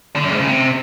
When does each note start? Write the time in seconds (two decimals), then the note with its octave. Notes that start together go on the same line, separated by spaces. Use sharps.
0.16 D3
0.24 F#2
0.31 G#2
0.39 C#3
0.47 C3